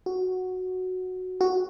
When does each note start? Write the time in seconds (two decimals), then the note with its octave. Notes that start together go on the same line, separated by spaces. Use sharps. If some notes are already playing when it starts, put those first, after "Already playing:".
0.06 F#4
1.41 F#4